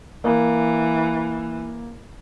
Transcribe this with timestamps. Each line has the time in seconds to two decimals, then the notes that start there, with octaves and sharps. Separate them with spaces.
0.24 E3 A#3